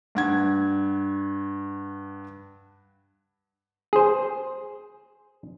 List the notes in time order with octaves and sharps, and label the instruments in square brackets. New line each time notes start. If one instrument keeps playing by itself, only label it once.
[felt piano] G2 F#5 G#6
[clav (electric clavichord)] G#4 C5